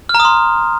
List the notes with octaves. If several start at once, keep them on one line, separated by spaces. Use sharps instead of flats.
F6
A#5
D#6
C6